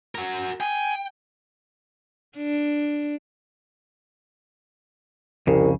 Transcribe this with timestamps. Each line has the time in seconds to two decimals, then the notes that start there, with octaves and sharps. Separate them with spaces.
0.15 F#4 A#4
0.60 G5 G#5
2.37 D4
5.47 C2 F2 C#3